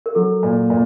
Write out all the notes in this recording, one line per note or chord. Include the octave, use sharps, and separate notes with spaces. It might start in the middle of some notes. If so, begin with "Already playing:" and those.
A#4
F#3 A4
A#2
A#2